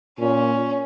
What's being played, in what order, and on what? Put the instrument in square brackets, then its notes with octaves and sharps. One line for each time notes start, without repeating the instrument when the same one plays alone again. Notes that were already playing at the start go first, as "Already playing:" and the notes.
[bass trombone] A#2 [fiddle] C#4